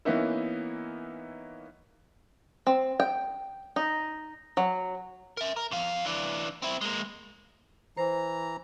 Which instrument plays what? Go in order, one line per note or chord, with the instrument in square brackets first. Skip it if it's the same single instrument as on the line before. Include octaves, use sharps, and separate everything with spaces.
[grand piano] E3 A#3 B3 C#4 D#4 E4
[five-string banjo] C4
G5
D#4
F#3
[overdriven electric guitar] A#4 E5
A#4
F2 F5
E3 D4
C4 E4
G#3 A#3
[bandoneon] E3 A#5 [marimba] C5